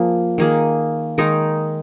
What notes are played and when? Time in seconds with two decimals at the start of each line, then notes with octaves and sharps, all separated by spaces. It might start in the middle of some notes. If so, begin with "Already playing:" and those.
Already playing: F3 A#3 G#4
0.38 D#3 A#3 G#4
1.18 D#3 G#3 D#4 A#4